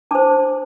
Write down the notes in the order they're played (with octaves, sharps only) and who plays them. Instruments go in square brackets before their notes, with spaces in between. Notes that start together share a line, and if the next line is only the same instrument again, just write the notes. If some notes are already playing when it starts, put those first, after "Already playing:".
[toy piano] D4 C5 A5 D6